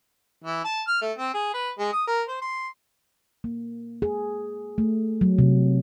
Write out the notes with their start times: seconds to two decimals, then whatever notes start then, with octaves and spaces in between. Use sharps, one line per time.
0.44 E3
0.65 A5
0.88 F6
1.02 A3
1.18 C4
1.34 G#4
1.54 B4
1.79 G#3
1.93 D#6
2.07 A#4
2.28 C5
2.42 C6
3.44 A#3
4.02 G#4
4.78 A3
5.21 F#3
5.38 C3